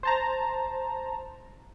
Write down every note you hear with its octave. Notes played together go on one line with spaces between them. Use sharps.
C5 A5 A#5